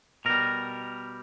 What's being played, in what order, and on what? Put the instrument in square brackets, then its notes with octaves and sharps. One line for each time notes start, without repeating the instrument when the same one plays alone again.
[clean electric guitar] B2 G3 A#4